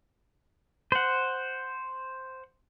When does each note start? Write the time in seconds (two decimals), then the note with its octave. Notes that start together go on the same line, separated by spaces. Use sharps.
0.92 C5 F#5